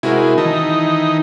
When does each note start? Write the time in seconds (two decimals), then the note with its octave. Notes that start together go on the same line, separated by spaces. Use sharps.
0.03 C3 G#3 E4 F#4 A#4
0.38 D#3 E3 D#4 A5